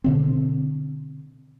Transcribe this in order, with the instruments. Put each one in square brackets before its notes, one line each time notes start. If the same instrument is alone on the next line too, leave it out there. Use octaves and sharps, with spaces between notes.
[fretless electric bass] B2 D3 C4